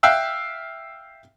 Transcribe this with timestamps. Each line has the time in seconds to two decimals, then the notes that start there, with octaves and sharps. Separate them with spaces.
0.03 E5 F5 G5 E6 F#6